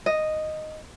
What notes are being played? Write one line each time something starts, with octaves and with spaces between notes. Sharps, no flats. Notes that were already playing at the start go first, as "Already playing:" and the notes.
D#5